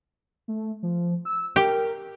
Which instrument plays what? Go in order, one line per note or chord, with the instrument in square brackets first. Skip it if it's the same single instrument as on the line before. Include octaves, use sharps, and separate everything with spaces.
[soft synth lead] A3
F3
E6
[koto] G4 [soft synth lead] A#4